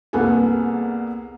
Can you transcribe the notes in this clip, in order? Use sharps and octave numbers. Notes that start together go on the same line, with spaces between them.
C2 A#3 B3 G#4 A4 G#5